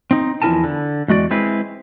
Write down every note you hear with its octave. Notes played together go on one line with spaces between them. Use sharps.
C4 D#4
E2 F3 E4 A#4 G#5 A5
D3
E2 G#3 F#4 D5
G#3 C4 E4 G#4 B4